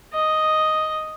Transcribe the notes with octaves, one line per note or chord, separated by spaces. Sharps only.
D#5